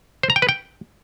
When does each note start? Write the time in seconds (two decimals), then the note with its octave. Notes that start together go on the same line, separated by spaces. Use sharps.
0.23 C5
0.30 A#5
0.36 G5
0.42 B4
0.49 G5